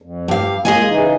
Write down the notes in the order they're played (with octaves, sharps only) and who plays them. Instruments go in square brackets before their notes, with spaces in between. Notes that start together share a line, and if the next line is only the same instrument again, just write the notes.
[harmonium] F2
[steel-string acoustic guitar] G2 F5 [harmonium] G4
[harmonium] G#3 A#3 [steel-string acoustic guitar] G#4 D#5 G#5
[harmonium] C#3 E3 D#4